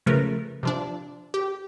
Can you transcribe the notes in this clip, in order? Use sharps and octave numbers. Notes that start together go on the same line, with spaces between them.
C#3 F3 A3 A#4 B4
C3 F3 D4
G4